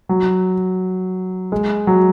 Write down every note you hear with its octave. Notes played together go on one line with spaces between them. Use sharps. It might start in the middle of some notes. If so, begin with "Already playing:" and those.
F#3
G#3
F#3